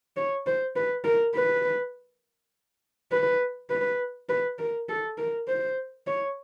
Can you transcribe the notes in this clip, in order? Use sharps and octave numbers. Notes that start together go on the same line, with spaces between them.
C#5
C5
B4
A#4
B4
B4
B4
B4
A#4
A4
A#4
C5
C#5